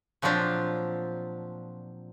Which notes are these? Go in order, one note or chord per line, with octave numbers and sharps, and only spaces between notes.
A#2 F3 F#3 C4 D4 G4